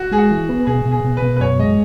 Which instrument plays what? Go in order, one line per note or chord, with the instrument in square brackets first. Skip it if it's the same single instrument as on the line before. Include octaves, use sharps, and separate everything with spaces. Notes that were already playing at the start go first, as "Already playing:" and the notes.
Already playing: [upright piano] F#4
[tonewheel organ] G#3 [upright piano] G#4
[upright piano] F#4
[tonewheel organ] E3
B3
[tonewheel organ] B2 [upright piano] G#4
[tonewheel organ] B2
[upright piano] G#4
[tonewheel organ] B2
[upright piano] B4
[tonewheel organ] B2
[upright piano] B4
[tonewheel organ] F#2 [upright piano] C#5
[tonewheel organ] G#3 [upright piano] D#5